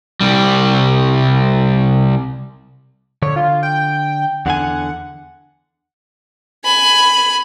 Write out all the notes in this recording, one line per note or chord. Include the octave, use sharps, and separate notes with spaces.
C2 G3
D3 C#5
F4
G5
E2 D3 F#5 G#5
G#5 B5